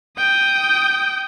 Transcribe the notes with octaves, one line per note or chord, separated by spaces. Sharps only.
G5 D#6